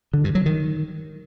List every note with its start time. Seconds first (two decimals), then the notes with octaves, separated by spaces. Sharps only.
0.14 D3
0.24 G2
0.35 F#3
0.46 D#3